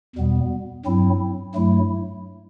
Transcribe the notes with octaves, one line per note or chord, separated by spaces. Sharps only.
E2 B2 G3 B3
G2 F#3 C4 E4
G2 F#3 A3 E4